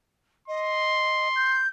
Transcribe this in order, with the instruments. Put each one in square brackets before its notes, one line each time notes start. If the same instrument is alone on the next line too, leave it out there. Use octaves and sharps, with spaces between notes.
[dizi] D#5 [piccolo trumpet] C6
[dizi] G6